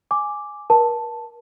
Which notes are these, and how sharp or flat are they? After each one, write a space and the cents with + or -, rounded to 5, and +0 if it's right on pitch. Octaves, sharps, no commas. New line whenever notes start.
G#5 +0 D6 +0
A#4 +40 A5 +0